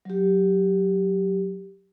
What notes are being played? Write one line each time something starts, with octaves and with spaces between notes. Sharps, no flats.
F#3 G4